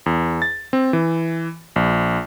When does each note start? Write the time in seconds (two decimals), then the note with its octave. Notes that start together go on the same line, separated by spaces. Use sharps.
0.06 E2
0.42 A6
0.73 C4
0.93 E3
1.76 A#1